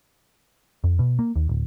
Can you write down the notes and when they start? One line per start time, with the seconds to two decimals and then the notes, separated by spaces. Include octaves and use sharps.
0.84 F2
0.99 B2
1.19 A#3
1.36 D#2
1.49 D1